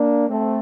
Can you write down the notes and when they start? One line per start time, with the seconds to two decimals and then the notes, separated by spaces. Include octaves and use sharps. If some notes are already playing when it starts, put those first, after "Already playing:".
Already playing: A#3 D4
0.29 A3 C4